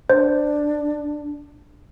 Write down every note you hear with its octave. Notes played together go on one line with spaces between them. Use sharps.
D4 C5